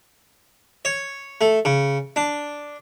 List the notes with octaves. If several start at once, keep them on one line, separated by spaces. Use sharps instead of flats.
C#5
A3
C#3
D4